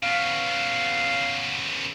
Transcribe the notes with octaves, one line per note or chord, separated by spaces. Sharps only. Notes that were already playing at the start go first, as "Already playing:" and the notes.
C#3 B3 F5